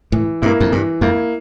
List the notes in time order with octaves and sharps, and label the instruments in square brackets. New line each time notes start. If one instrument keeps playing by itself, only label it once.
[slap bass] A2 [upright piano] E3
[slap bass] G2 [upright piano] A#3 E4
[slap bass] F2
[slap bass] G2 [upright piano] E3
[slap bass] F2 [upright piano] A#3 E4